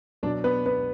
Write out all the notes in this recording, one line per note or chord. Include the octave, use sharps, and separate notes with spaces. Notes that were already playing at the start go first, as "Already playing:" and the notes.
B2 F#3 D4 D5
B3 B4
B3 B4